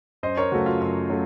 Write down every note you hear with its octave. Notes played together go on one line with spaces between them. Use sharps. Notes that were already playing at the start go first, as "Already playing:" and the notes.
F#2 C5 D#5
A#4 C#5
C#3 F#3 A3 F#4
F4
F#2 F4
C#3 F#3 A3